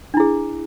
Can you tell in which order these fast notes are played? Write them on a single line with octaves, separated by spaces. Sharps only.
D4 E4 G#4